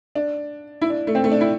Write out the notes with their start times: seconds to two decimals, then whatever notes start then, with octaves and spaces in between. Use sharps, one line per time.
0.15 D4
0.82 E4
0.90 D4
1.07 A3
1.15 C4
1.24 A3
1.32 D4
1.41 E4